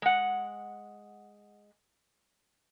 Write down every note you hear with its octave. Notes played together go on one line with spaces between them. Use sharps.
G#3 F#5